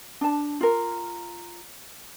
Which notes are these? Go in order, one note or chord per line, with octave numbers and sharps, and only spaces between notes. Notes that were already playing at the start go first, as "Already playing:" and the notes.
D4 A5
F4 A#4